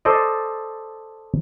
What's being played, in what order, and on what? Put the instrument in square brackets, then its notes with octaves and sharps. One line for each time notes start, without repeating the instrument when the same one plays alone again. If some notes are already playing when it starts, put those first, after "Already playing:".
[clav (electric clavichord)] A4 C5 D5 D#5